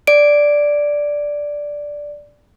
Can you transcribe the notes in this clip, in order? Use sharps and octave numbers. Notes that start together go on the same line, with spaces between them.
D5 D7